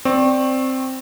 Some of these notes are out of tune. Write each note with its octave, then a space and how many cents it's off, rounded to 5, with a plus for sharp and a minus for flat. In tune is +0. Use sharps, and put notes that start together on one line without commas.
C4 +0 D5 +0 C#6 -25